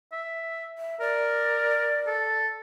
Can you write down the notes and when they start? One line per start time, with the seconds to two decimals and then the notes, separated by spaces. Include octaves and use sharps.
0.12 E5
0.78 E5
1.00 A#4 D5
2.07 A4